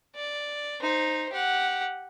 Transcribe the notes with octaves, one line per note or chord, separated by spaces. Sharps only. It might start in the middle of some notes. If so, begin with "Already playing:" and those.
D5
D#4 C5
G4 F#5